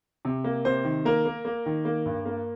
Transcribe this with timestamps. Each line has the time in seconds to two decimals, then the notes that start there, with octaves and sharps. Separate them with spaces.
0.25 C3
0.44 A#3
0.65 C3 C5
0.85 D#3
1.05 A#3 A#4
1.25 A#3
1.45 A#3
1.66 D#3
1.85 A#3
2.05 G2
2.26 A#3